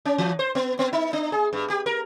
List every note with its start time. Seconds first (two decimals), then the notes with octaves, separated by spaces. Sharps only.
0.05 C#4
0.18 E3
0.39 C5
0.55 B3
0.79 B3
0.93 D#4
1.13 D4
1.32 G#4
1.53 G2
1.70 G4
1.86 A#4